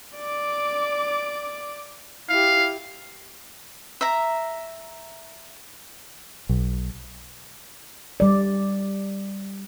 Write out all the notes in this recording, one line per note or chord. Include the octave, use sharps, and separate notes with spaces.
D5 D6
E4 G4 F5
E5 A#5
B1
G3 D5